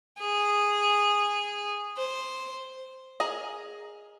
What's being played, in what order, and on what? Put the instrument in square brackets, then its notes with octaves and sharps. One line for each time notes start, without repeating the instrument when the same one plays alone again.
[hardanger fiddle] G#4
C5
[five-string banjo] G#4 A#4 D#5